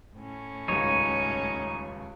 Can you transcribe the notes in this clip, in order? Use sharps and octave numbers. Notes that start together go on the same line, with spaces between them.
A2 C#4
D#1 C#2 D#4 C#5